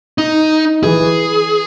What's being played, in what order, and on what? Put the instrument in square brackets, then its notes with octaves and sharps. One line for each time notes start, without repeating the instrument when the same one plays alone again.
[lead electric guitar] D#4
[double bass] E3 [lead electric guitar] G#4